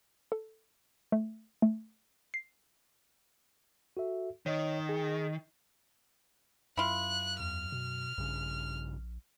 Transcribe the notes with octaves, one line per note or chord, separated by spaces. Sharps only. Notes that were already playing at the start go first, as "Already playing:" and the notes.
A4
A3
A3
C7
F#4 A4 E5
D#3 C#5 D#5 D#6
G#4
F#2 E4 F4 F#6
E2 F6
B2
A#1 G2 C#3